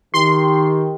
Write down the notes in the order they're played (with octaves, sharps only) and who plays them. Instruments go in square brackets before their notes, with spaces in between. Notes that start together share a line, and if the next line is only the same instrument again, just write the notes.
[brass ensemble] D#3 G4 [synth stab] C6